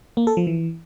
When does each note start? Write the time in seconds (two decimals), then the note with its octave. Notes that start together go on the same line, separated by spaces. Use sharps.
0.17 A#3
0.27 A4
0.37 F3
0.47 E3